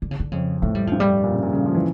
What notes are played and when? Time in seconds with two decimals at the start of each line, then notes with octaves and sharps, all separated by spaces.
0.02 D3
0.11 C#3
0.20 D3
0.32 F2 C#3
0.62 A2 A3
0.75 G3
0.87 G2 F3
1.00 G3
1.24 A#2
1.33 C#3
1.43 A#2
1.53 C#3
1.66 F3
1.74 E3